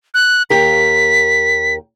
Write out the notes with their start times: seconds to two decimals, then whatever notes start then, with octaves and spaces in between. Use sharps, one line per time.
0.14 F#6
0.50 D#2 G4 A#4 B6